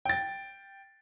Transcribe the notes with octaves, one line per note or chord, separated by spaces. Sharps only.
G5 A6